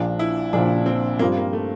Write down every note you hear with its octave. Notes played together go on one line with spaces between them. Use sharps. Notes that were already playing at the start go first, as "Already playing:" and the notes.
Already playing: A#1 A#2 F3 D4
E4
A#1 A#2 F3 D4
C4
G2 F3 A#3 C4 F4
A#3
A3